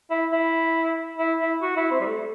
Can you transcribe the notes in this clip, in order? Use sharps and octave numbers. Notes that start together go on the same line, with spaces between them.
E4
E4
E4
E4
F#4
E4
C4
G3
A3